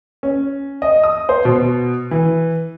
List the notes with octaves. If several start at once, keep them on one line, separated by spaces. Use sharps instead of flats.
C#4
D#5
D#6
C5
B2
E3